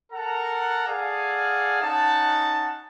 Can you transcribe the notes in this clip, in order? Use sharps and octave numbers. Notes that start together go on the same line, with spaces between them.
A4 A#4 F#5 A5 A#5
G#4 A4 D5 F5 F#5 G#5
C#4 D#4 F#5 A5